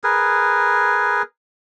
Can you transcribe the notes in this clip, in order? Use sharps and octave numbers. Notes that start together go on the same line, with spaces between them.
G#4 A#4 B4